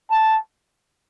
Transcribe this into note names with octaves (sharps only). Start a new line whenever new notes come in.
A5